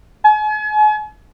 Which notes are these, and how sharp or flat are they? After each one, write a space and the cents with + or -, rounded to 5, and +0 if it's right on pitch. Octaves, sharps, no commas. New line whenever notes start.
G#5 +40